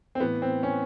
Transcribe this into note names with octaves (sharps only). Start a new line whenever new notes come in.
C4
A2 E3 B3
C4
C#4